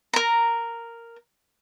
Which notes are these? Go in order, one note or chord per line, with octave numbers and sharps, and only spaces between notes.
A#4 A#5